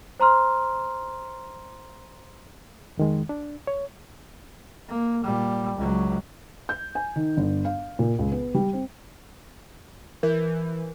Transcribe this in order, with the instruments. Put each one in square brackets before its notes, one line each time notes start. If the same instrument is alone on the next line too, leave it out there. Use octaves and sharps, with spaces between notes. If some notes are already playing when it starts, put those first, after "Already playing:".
[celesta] C5 A#5 C6 F6
[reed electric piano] F2 D#3 G#3
D4
C#5
[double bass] A#3
A#2 G3
C#2 F#3
[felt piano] G6
G#5
D#3
G1
F5
A#2
C#2
B3
G3
C4
[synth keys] E3 [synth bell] A#4